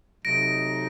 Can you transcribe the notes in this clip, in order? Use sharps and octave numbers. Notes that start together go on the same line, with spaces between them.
C3 F#3 A3 D#4 A#6 D7